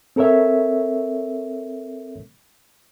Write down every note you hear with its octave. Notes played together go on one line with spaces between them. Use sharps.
C4 A4 A#4 C#5 E5